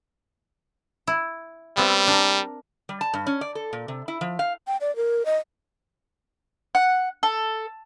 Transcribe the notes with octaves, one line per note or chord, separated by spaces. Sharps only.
E4
G3 B3 C4 E5
D4 A#4
G3
A5
G2
C#4
D5
A4
A#2
C3
E4
F3
F5
G5
D5
A#4
D#5
F#5
A4